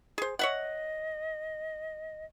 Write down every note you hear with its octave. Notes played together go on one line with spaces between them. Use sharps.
G#4 C5
C#5 D#5 E5 F#5